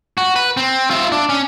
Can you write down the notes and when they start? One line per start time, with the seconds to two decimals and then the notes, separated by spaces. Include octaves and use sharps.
0.18 F#4
0.36 B4
0.57 C4
0.90 F4 E5
1.12 D4
1.29 C#4